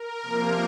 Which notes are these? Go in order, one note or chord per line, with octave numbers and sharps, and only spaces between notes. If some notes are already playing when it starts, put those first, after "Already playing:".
Already playing: A#4
C3 F3 A#3